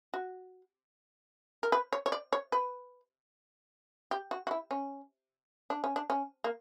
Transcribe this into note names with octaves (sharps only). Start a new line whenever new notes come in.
F#4
A#4
B4
C#5
C#5
D5
C#5
B4
G4
F#4
F#4
E4
C#4
D4
C#4
D4
C#4
A#3